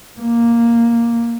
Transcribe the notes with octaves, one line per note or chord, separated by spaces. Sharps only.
A#3